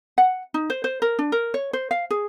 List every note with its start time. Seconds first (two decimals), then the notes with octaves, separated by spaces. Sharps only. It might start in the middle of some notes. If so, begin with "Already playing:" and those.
0.18 F#5
0.54 D#4
0.70 C5
0.84 C5
1.02 A#4
1.19 D4
1.32 A#4
1.54 C#5
1.73 C5
1.91 F5
2.11 G#4